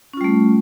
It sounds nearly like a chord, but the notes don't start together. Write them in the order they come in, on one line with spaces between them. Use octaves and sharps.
C#4 F4 G3 A3